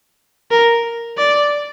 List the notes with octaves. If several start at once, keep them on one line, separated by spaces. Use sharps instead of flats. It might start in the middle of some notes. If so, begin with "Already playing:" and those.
A#4
D5